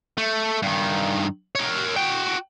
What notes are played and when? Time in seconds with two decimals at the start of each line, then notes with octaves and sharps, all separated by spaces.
0.18 A3
0.62 G2 D#3
1.55 A#4 C#5
1.96 F#4 G5